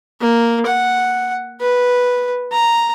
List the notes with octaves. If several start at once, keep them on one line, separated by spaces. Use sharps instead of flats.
A#3
F#5
B4
A#5